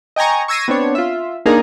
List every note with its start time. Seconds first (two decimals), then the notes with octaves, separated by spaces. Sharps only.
0.16 D#5 G5 G#5 A#5 C#6
0.48 C#6 E6 G#6 A#6 C7 D#7
0.68 B3 C4 D4 C#5
0.95 F4 E5
1.46 A#3 D4 D#4 G#4 A#4